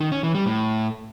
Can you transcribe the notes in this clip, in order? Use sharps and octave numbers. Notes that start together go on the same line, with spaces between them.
D#3
C#4
E3
G3
A2